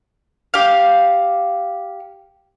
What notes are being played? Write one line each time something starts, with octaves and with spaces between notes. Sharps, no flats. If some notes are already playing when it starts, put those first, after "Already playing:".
G4 F5